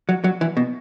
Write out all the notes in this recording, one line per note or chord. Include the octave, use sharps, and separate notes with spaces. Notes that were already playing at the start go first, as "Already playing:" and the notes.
F#3
F#3
E3
B2